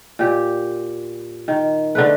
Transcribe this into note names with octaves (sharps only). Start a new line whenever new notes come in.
A#2 G4
D#3
D3 A3 B4